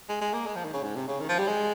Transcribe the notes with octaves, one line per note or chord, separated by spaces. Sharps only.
G#3
G#3
A#3
G#3
F3
D#3
C#3
G#2
C3
C#3
D#3
F3
G3
G#3